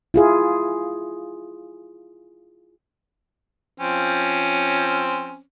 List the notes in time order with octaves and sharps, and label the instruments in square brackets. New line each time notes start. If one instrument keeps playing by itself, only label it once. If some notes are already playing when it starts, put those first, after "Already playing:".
[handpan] E4 F4 G#4
[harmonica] F3 C4 C#4